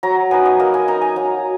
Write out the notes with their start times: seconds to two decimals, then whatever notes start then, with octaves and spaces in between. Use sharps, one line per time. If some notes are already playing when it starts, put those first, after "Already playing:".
0.03 F#3 A#5
0.31 B3 D#4 G#5
0.45 D#5
0.59 A#3 D#5
0.74 G#5
0.88 D#4 A#5
1.01 G#5
1.16 F#3 A#5